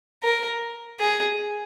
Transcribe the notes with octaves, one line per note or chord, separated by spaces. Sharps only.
A#4
G#4